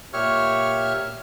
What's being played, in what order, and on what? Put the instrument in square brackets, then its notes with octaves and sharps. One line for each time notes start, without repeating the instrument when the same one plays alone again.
[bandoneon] A#2 G4 C#5 E5 C#6 F6